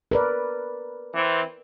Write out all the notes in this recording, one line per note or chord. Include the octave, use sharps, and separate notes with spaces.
A#4 B4 D5
E3 C4